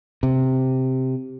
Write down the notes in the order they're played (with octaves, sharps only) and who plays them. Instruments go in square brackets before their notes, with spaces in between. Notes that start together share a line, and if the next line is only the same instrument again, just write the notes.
[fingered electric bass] C3